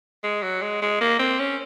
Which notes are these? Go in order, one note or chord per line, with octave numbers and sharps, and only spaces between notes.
G#3
F#3
G#3
G#3
A#3
C4
C#4